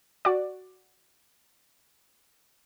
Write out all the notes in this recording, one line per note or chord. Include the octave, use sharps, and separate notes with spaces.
F#4 D5